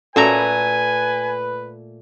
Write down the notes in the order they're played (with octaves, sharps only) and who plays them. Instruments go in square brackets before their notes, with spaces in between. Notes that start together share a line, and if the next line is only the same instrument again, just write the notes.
[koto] A#2 A3 A#5 [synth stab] C#4 F#4 A4 [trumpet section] B4 [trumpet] G#5